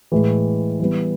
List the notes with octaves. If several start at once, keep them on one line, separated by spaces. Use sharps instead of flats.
A2 E3 G#3
E3 G3 B3